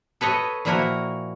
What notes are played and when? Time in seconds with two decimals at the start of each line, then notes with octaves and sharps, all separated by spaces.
0.21 A4 B4 C#5 D#5
0.65 A#2 F3 A#3 E4 F#4 A#4